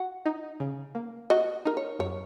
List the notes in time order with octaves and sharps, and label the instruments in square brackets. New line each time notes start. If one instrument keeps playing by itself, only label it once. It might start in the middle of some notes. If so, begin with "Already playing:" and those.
Already playing: [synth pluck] F#4 [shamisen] F#5
[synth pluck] D#4
C#3
A#3
[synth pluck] F#4 [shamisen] D#5
[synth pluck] D#4 [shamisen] A#4
[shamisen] C#5
[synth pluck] F#2 [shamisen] C#5